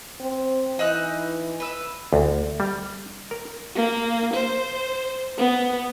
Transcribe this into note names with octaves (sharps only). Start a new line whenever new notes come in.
C4
E3 D#4 E6 F#6
B4 E6
D2
G3
A#4
A#3
C5
B3